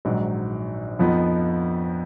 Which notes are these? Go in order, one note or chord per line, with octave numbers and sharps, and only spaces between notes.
A#1 G#2 D#3 F#3
F2 F3 B3 D#4